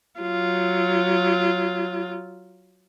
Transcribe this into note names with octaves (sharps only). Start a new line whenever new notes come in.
F#3 F4